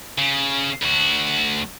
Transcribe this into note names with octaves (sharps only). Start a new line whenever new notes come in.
C#3
D2 F#4